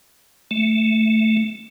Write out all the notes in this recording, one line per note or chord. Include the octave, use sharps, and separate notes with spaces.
A3